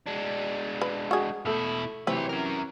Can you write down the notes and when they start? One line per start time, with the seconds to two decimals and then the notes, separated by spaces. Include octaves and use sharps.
0.06 G#3 D4
0.82 B4
1.11 F#4 G#4
1.45 B2 A3 E4 A4 E5
2.07 C3 E3 F#3 C4 B4 C#5
2.29 C#4 A#4